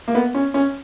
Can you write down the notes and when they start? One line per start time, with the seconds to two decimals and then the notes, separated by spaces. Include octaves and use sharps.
0.08 A#3
0.15 B3
0.35 C#4
0.54 C#4